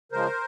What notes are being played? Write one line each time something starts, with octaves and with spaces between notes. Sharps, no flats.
C#3 F3 G#3 A#4 C5